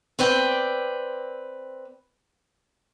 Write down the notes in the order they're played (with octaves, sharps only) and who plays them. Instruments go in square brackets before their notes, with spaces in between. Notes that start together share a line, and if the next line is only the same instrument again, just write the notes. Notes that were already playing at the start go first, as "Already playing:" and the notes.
[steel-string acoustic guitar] C4 B4 D5 G5